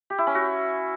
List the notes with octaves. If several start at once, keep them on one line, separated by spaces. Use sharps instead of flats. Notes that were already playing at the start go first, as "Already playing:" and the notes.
G4
E4
C#4
F#4